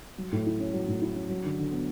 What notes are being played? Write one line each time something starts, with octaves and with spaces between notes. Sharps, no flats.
F#3
A2
E4
C#4
F#3
A2
E4
C#4
F#3
D3
D3
B3